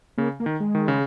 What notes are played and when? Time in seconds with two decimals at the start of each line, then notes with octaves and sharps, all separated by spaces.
0.18 C#3 A#3
0.40 A#3
0.46 D#3
0.60 G#3
0.75 D#3
0.88 C#3